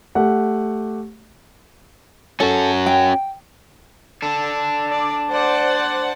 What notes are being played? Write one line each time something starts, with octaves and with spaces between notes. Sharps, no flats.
A3 G4 F#5
C#4 F#4 A4
G5
D4 A4
D5
C5 D5 F#5